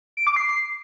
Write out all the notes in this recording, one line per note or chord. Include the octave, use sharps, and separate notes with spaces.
D7
D6
C7